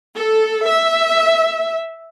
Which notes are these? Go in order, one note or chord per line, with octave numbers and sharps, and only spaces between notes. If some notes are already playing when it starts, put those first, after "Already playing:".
A4
E5